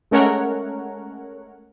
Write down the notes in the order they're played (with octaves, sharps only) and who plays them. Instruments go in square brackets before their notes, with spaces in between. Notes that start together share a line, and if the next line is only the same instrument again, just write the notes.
[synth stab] G#3 A3 C#4 A#4 C#5 F#5